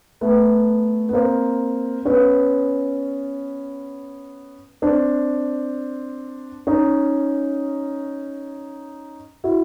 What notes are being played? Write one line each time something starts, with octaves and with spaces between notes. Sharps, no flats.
A3 B3
B3
A#3 C4
B3 C#4
C4 D4
C#4 D#4
E4 F#4